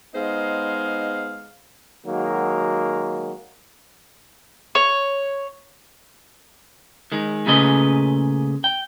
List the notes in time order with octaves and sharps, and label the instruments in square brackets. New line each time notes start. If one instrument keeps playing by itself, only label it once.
[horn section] G#3 B3 D#4 C5 D#5 F5
[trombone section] D#3 F#3 G#3 A#3 F#4
[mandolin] C#5
[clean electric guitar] D#3 G#3
A#2 C#3 A3 G#4 B4 D#5
G5